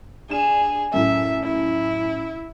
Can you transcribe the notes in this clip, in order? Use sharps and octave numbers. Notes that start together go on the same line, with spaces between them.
D4 G#4 E7
F#2 A2 E5
E4